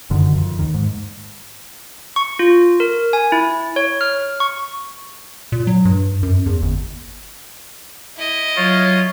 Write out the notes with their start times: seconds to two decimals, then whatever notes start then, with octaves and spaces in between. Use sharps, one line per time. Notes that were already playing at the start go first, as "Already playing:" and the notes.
0.10 F1 F#2 D3 D#3
0.36 F2
0.59 D#2 D#3
0.74 G#2
2.16 C#6
2.39 F4
2.80 A#4
3.13 G#5
3.32 E4
3.76 C#5
4.01 F6
4.40 C#6
5.52 A#2
5.67 F#3
5.85 G2
6.23 F#2
6.46 E2
6.62 G1
8.16 E4 D#5
8.57 F#3 F4 C#5